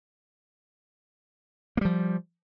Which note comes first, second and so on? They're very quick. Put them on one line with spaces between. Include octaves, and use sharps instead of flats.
A#3 G3 F3